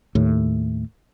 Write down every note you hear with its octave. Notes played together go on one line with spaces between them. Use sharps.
D#2 A2